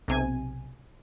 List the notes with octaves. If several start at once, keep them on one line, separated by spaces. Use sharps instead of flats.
B1 C3 G#5